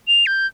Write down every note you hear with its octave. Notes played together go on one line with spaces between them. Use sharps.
F7
G6